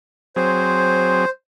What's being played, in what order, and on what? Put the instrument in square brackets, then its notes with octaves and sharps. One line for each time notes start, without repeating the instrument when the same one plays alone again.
[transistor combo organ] F#3 C4 G#4 [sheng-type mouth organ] C5